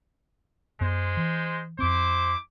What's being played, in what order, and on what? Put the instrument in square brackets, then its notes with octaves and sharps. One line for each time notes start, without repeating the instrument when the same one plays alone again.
[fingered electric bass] F#2 B3 [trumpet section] G#3 C5
[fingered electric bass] E3
[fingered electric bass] F2 C4 [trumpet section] E4 C5 D6